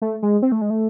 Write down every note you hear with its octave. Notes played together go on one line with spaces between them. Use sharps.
A3
G#3
C4
A3
G#3
A3